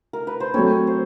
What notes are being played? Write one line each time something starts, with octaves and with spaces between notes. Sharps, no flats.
A#4
B4
C5
F#3 A3 C4 C#5
C5